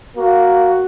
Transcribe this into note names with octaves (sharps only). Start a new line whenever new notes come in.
A#3 F#4